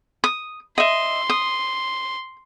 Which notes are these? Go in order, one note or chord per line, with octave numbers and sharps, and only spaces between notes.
D#6
D#5 E5 C6
D#6